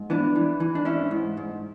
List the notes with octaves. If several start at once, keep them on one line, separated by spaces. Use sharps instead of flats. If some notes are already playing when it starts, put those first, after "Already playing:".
Already playing: G#2
E3 B3 D4
E3
E3
D4
G#2 C#4 E4
G#2
G#2